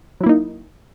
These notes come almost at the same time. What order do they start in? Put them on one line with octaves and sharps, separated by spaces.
F#3 E4 A#3 D#4